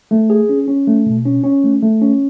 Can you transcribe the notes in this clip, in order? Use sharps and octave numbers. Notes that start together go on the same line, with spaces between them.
A3
G#4
C#4
C#4
A3
B2
C#4
C#4
A3
A3
C#4